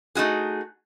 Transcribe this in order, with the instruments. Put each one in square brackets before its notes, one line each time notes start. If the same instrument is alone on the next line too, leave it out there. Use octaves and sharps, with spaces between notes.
[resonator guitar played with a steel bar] A3 D#4 F#4 G#4